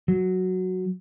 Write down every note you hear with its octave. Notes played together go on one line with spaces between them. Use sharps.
F#3